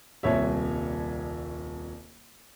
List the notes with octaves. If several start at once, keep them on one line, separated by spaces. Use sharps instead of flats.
D#1 C2 C#5 E5